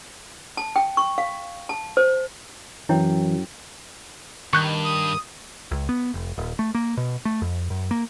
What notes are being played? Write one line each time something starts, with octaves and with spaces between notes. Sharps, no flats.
A5
G5
C#6
F5
A5
C5
F#2 E3 E4 C#5 G5
G2 D#3 C#6 F#6 G6
D#6
C#2
B3
F1
D#1
A3
A#3
B2
A3
F2
F#2
A#3